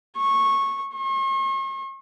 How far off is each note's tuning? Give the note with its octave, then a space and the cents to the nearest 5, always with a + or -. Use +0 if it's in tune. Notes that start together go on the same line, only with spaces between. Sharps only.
C#6 -15
C#6 -45